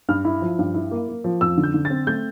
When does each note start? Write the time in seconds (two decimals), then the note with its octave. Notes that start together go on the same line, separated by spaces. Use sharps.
0.09 G2 F6
0.25 E4
0.42 F3
0.59 G2
0.74 E4
0.91 A#3
1.09 A#3
1.24 F3
1.41 F2 E6
1.58 D3
1.63 G6
1.74 D3
1.85 A6
1.90 C4
2.07 A3 G6